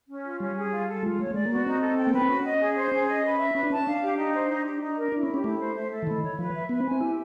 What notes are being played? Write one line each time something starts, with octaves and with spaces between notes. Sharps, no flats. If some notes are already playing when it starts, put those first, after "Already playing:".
C#4
F4
G3 C#4
G#4
F4
A4
G#3 F4
A3 C#5
A3
G#3 D5
A#3 F#4
B3
C4 D#4
A4
G5
A#3
B3 B4
C4
C#4 F#4
D#5
G#4
C5
C#4 G#4
D#5
B4
E5
C#4 B4
D4
C#4 A5
D4 F5
G4
D#4
C5
D#4
G4
D#4
A#4
D4 E4
C#4
G4
C#4
A3 E4
C5
E5
A4
E3
D#3 E4
C#5
F3 B4
E5
B3 B4
C4
G#5
C4
E4 G4